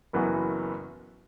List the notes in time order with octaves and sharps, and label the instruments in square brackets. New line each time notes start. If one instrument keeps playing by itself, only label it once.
[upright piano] F#1 F#2 E3 B3 F#4